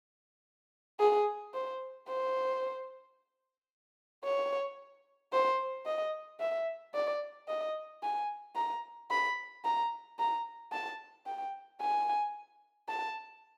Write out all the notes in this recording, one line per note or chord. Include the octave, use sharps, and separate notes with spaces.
G#4
C5
C5
C#5
C5
D#5
E5
D5
D#5
G#5
A#5
B5
A#5
A#5
A5
G5
G#5
A5